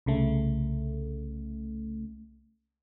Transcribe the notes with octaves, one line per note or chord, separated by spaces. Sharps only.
C2 C#3 A3